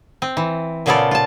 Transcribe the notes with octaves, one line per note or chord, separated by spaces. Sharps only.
C4
E3
A#2 C#3 B3 F4 A4 D5
F4 A5